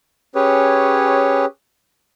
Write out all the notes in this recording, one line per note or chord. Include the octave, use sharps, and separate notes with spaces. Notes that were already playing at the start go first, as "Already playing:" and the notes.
C#4 G4 G#4 B4 C#5